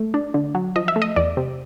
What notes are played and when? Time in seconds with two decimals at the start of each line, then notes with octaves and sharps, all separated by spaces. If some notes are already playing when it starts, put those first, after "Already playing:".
Already playing: A3
0.14 D4
0.34 D3
0.55 F#3
0.76 F3 D#5
0.88 E5
0.96 A3
1.02 D#5
1.16 E2 D5
1.37 C3